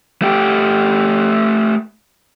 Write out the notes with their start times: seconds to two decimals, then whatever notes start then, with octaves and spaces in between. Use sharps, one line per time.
0.22 A3 G4